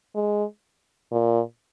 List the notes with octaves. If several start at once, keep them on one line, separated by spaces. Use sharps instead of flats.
G#3
A#2